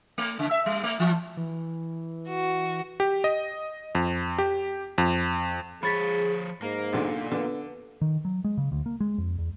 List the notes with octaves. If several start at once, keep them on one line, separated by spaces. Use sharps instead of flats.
A3
C#3
E5
G3
A3
E3
E3
F#4
G4
D#5
F2
G4
F2
F3 G#4 C#5 B5 A6 B6
G#2 A#3
B1 A#2 D3
D3 B3
D#3
F#3
G#3
C#3
D2
A#3
G#3
F2
E2